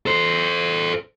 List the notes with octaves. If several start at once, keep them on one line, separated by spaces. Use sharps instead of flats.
A4 C5